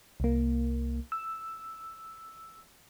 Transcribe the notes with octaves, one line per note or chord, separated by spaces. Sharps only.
C2 A#3
E6